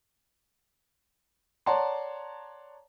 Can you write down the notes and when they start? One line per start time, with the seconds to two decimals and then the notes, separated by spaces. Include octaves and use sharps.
1.66 C#5 D5 F#5 A5 A#5 C6